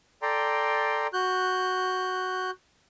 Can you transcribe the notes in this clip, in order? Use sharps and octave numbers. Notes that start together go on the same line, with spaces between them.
A4 D5 G5 A#5 C6
F#4 F#6 G6